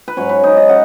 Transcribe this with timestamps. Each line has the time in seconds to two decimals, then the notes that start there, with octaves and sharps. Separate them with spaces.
0.08 B4
0.17 G#2 F#3 C#4 C#5
0.29 B4
0.44 D#4
0.57 D#5
0.69 C#3 F#5